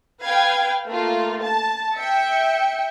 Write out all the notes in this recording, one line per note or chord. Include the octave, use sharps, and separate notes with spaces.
B4 F5 G5 G#6
A3 A#3 F4
A5
E5 G5 C#7